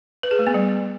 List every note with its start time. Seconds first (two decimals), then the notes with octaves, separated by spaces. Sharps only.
0.23 B4
0.31 G#4
0.39 A3
0.47 B3
0.54 G3